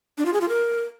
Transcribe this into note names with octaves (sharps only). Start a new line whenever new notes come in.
D4
F4
G#4
F4
A#4